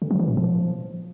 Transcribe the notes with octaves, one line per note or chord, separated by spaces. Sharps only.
D3
F#3
E3
A#2
F3